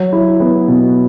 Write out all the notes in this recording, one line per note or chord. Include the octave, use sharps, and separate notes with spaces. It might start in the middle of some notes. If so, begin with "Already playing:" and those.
Already playing: F#3
E4
B3
B2